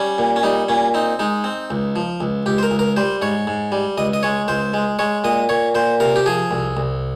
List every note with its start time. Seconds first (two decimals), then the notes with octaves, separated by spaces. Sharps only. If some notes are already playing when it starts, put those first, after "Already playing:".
Already playing: G3 C#4
0.18 A#2
0.36 C#4
0.43 G3 D#4
0.69 A#2 C#4
0.94 C4 D#4
1.19 G#3 D#4
1.44 C4
1.71 C#2
1.96 F3
2.21 C#2
2.46 C#2 G4
2.58 C5
2.63 A#4
2.71 C#2
2.79 A#4
2.97 G3 C5
3.22 G#2 C#5
3.47 G#2
3.72 G3
3.98 C#2 D#5
4.13 D#5
4.23 G#3 C#5
4.48 C#2 C5
4.74 G#3
4.99 G#3 C#5
5.24 A#2 D#5
5.49 A#2 C#5
5.75 A#2 C5
6.00 C3 A#4
6.16 G4
6.26 F3 G#4
6.51 C2
6.77 C2